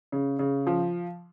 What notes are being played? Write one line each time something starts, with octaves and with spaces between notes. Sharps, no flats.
C#3
C#3
F3